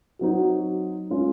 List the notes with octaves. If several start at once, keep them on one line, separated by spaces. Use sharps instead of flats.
F#3 C4 D#4 F#4
G#3 C#4 F4 G#4